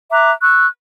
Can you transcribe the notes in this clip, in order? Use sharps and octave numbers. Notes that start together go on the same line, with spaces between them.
E5 A#5 D6 F#6
C#6 E6 F#6